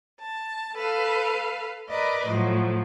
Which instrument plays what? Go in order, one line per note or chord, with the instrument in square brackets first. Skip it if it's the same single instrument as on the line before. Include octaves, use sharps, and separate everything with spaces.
[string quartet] A5
A4 B4 F5
A#4 B4 D5 D#5
A2 F3 F#3